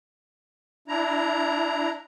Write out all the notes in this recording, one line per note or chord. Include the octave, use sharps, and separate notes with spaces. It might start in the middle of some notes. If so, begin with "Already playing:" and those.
D4 E4 A#5